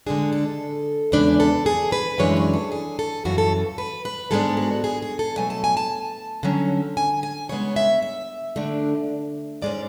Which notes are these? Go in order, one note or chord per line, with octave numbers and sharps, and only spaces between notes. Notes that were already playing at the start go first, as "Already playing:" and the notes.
D3 G#3 D4 G#4
A4
E2 C#3 G#3 D4 B4
A4
G#4
B4
F#2 C#3 E3 G#3 D4 C#5
G#4
A4
G#4
A4
F#2 C#3 E3 F#4
A4
B4
B4
G#2 G#3 B3 D4 A4
F#4
G#4
G#4
A4
B2 F#3 A3 G#5
A5
G#5
A5
D3 F#3 C#4
G#5
G#5
C#3 G#3 B3 C#5
E5
E5
D3 A3 D4
G#2 G#3 C#4 D5